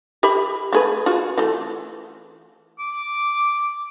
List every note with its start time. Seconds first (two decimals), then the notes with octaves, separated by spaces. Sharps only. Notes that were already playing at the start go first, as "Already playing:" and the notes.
0.23 G4 E5 B5
0.73 A3 G#4 B4
1.06 F4 F#4
1.38 E3 A3
2.79 D6